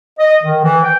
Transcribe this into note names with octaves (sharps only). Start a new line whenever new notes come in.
D#5
D#3
E3
G5